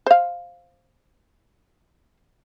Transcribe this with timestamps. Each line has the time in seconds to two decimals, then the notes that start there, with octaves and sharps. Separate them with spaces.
0.06 C5 F5